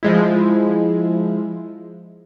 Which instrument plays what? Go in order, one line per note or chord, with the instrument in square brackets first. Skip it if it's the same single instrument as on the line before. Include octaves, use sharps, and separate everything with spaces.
[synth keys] F3 G#3 E4